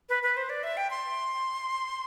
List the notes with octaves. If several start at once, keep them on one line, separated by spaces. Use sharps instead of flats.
B4
B4
C5
D5
E5
G5
C6